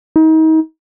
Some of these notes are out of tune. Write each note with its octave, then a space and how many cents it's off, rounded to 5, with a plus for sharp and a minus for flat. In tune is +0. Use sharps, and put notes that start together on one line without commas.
D#4 +35